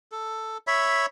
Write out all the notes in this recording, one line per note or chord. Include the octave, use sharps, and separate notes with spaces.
A4
C#5 E5 B5